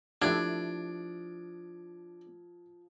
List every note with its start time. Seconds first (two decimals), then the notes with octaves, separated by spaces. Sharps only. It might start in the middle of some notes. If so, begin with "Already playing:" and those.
0.22 F3 A3 D4 E4 G4 G#6